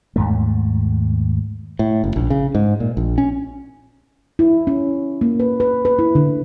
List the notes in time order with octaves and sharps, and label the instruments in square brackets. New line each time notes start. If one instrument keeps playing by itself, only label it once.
[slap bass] D#2 G#2 A3
[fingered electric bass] A2
F#1
A#1
C#3
G#2
A#2
A#1
C#4
[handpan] E4
C#4
A#3
B4
B4
B4
E4
D3